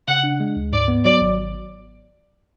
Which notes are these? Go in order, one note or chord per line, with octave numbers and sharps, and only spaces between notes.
C#3 F#5
D4
G#3
D2
G#2 D5
B3
F#3 D5
G#1